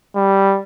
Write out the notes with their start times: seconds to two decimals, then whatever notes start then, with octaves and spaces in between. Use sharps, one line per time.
0.15 G3